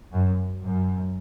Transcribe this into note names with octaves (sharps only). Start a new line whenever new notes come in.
F#2
F#2